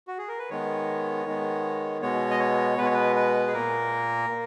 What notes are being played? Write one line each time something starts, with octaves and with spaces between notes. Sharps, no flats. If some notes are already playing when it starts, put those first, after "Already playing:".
F#4
G#4
A#4
B4
D#3 G#3 B3 C#5
D#3 G#3 B3
B2 G#3 B3 C#5
D#5
C#5
B2 G#3 B3 B4
C#5
B4
B4
G#4
A#2 A#3 A#4
A#2 A#3